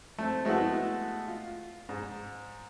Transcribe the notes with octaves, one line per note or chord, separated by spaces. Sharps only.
A3 C4
G#3 A3 B3 E4 F#4
F4
G#2